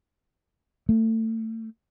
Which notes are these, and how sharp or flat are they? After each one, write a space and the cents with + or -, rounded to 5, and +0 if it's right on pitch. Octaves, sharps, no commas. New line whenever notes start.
A3 +30